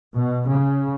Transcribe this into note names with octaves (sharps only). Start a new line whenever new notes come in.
B2
C#3